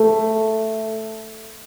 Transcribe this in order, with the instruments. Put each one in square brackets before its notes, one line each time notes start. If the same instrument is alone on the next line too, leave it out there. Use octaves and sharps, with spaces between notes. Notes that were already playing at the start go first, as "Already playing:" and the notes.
Already playing: [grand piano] A3